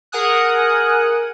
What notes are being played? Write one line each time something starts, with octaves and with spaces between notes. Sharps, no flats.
G#4 A#4 F#5 G#5 D#6 F#6